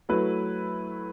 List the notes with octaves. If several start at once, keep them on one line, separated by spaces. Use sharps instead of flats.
F#3 A3 E4 B4